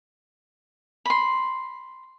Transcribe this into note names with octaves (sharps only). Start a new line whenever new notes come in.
B5 C6